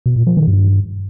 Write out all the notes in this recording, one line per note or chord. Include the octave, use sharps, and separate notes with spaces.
B2
A#2
F3
D#3
G2